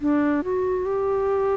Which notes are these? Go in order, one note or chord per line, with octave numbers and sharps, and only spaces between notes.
D4
F#4
G4